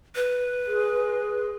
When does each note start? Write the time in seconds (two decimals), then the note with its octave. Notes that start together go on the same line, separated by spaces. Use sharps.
0.15 B4
0.66 G#4